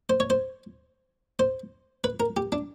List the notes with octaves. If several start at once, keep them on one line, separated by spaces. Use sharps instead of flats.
C5
C#5
C5
C5
B4
A#4
G4
D4